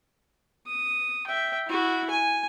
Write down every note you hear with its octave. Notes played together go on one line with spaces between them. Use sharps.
D#6
E5 G5
E4 F#4
G#5